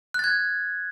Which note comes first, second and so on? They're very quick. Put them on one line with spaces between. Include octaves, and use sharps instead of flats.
F#6 A6 G#6